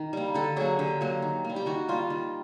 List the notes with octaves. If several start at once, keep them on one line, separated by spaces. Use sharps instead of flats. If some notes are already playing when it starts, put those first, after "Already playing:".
Already playing: D#3
G3 A#3
D3 A4
F#3 A#3 G#4
D3 G4
F#3 A#3
D#3
G3 A#3
G4
D#3 F#4
G3 A#3 F4
D#3